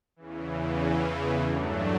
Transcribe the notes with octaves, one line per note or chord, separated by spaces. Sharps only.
E2 C#3 E3
G2 F#3 A3 D4